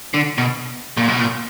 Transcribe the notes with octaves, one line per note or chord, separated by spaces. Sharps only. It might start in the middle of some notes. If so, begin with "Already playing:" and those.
D3
B2
A#2
B2
A#2